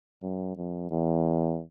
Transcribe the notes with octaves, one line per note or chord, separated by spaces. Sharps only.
F#2
F2
E2